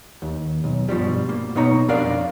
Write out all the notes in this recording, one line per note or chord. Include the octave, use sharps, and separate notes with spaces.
D#2
B1
G2 B2 F3 G3
A#3
B2 B3 D#4 C#5 A#5
F2 D4 A#4 D5 F5